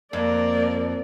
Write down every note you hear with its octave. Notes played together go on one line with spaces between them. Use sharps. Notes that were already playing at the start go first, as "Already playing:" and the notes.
F2 A#3 D5